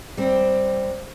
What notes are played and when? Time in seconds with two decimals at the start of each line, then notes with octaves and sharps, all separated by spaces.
0.17 G3 C4